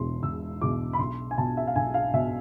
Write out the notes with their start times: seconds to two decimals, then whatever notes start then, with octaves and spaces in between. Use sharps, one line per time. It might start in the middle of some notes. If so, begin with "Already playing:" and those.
Already playing: E1 E2 B2 C6
0.23 E1 E6
0.61 E2 B2 D6
0.93 B5
0.99 B1 C6
1.31 G#5
1.38 B2 A5
1.57 E5
1.67 F5
1.76 B1 G#5
1.94 F5
2.14 B2 E5